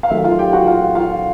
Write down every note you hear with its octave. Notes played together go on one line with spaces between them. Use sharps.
F5
D#3 F#3 A3 E5
F4 F5
G4 G5
F#4 F#5
F4 F5
F4 F5